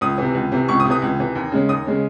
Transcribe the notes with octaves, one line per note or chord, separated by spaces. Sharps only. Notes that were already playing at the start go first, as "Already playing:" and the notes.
C#2 D#6
C3 E3
C#2
C3 E3
C#2 C#6
D#6
C3
E3 D#6
C#2
C3 E3
D#2
C#3 G#3 C#4
D#2 D#6
C#3 G#3 C#4